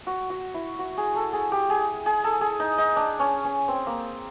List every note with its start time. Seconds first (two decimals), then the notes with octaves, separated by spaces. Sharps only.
0.07 F#4
0.30 F#4
0.54 E4
0.79 F#4
0.97 G#4
1.16 A4
1.33 G#4
1.52 G4
1.70 G#4
2.06 G#4
2.24 A4
2.41 G#4
2.60 D#4
2.78 D#4
2.96 D4
3.19 C#4
3.44 C#4
3.68 C4
3.87 A#3